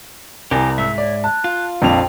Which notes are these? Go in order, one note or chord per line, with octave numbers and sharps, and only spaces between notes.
C2 G4 A#4 G#5
G#2 E5 E6
C#5 D5
A5 F#6
F4
A#1 F2 G5 F7